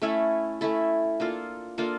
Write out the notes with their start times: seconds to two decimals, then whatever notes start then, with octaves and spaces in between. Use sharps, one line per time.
0.02 A3 C#4 E4 A4
0.61 A3 C#4 E4 A4
1.20 A#3 D4 F4 A4
1.78 A#3 D4 F4 A4